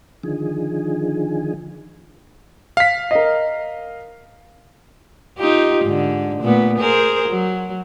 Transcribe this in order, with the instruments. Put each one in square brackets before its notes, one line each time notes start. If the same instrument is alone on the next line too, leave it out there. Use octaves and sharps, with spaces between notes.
[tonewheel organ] D3 D#3 F3 G#4
[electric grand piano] F5 B6
[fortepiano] A#4 D#5
[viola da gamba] D#4 F4 G4
G#2 D3
A#2 A3 B3
G#4 A#4 C5
F#3